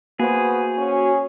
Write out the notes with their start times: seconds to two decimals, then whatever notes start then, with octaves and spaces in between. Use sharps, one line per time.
0.20 A#3 B3 F#4 G#4 C5
0.78 C#4